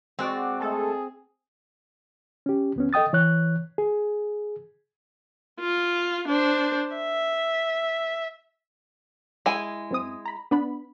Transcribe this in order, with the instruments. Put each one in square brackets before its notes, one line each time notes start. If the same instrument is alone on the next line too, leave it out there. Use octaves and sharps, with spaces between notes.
[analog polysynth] G#3 F#4 D5 [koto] C4
[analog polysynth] G#3 A3 A4 [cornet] G#4
[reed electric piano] C#4 G4
D2 B3 C#4
A4 D#5 G5 D#6 A6
E3 C#5 F#6
G#4
[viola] F4
D4 C5
E5
[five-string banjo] G#3 E4 G#5
[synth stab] F#2 C4 D#6
A#5 B5
B3 D4 B5